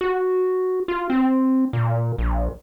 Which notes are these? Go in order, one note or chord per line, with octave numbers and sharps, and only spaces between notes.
F#4
F4
C4
A#2
A#1